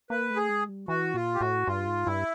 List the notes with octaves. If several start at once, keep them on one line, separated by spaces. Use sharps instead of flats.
A#3 B4
A3
G#4
G#3
G3
E3 F#4
A#2 F4
G4
A2 F#4
G2 F4
G#2
G2 E4